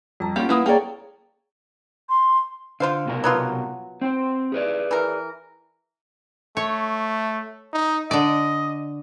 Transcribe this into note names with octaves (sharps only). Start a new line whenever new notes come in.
F2 G3 A5 A#5
G3 A#3 C#4 F4 G4 F#5
A#3 E4 B4 D#6
A#3 G#4 A4 C#5 D5 G5 A#5
C6
D3 F4 C5 F5
C2 B2 A#4
F#3 B3 F4
C4 C5
G#4 B4 D5
E3 A#4
A3 C#5
D#4
D3 D5 D#5